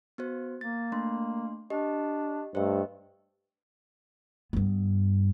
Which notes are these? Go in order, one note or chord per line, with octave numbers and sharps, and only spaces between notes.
B3 F#4 C5
A#3 A6
A3 D4 C6
D4 G4 D#5
G2 A3 C5 D#5
G2 B3